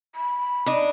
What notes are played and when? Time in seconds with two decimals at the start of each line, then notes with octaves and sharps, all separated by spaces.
0.15 B5
0.66 D4 D#4